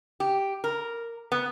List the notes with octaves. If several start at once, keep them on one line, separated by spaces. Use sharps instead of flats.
G4
A#4
B3